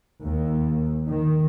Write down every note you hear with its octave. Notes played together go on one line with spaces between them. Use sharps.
D#2
D#3